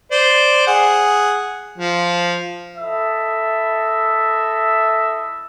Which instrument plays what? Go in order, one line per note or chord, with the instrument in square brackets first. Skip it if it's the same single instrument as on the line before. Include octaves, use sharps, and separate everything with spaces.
[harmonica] C5 D5
G#4 F#5
F3
[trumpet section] E4 A4 D#5 E5